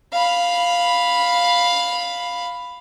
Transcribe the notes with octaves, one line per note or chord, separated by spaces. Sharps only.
F5 B5